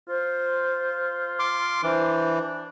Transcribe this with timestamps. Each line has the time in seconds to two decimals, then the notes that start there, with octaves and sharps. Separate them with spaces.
0.09 F4 C5
1.39 C6 D6
1.83 E3 D4 C5